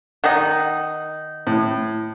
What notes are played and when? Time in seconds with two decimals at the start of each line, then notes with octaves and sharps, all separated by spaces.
0.24 D#3 D#4 F#5
1.47 A2